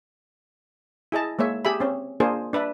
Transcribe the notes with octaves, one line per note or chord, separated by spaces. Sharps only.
E4 G#4 D#5 A5
G#3 A#3 C#5 E5
G4 G#4 E5 B5
C4 C#4
A#3 D4 F4 G#4 A#4 C5
D4 B4 D5 E5